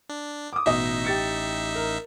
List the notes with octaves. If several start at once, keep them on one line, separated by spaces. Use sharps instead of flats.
D4
D6 D#6
A1 B2 D#4 D#5 E5
G4 A6 C#7
A#4